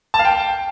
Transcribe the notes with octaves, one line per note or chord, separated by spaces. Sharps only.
A5
F5
G5